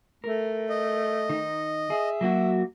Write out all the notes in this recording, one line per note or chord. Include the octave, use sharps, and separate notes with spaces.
A3 A#4
D#5
D#3 D#4
G#4 E5
F#3 A#3 F#4